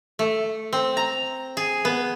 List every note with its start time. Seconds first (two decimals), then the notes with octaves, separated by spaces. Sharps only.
0.19 A3
0.73 C4
0.97 A#5
1.57 G#4
1.85 B3